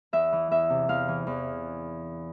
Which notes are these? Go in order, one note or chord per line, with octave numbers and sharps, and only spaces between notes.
E2 E5
E3
E2 E5
C3
E2 F5
E3
E2